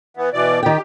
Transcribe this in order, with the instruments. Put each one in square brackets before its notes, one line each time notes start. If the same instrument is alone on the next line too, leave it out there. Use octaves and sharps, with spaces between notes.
[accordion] E3 B3
B2 E3 D5
[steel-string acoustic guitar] D#3 G5 [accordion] G4